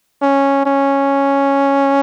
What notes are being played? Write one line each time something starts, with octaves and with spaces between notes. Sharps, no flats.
C#4
C#4